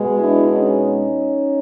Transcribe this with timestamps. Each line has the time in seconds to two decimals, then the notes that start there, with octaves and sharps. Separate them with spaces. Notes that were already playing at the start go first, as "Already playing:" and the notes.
Already playing: B2 G#3 B3
0.18 D4 E4
0.47 C#4 D#4